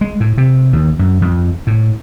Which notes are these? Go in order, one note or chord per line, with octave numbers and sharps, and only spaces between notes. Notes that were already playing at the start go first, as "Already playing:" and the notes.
G#3
A2
C3
D#2
F#2
F2
A2